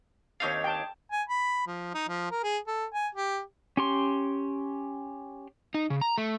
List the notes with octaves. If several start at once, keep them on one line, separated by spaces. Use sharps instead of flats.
D#2 C4 D4 D#4 C#5 F5
G5 A5
G#5
B5
F3
D#4
F3
A#4
G#4
A4
G#5
G4
C#4 G4 C6
D#4
C#3
A#5
A3